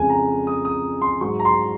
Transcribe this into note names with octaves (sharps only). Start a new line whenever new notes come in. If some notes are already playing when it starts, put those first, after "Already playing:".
Already playing: F2 C#3 G#3 G#5
A#5
D#6
D#6
C6
G#2 F#3 C#6
A#5
C6